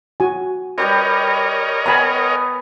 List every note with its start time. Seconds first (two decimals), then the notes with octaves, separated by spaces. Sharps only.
0.20 F#4 G#5
0.78 G3 G4 A#4 B4 C#5 D#5
1.86 B3 G#5 A#5 B5